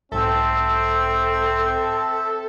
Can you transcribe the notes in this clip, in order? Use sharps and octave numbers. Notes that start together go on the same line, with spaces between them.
B1 G#2 C4 A4 E5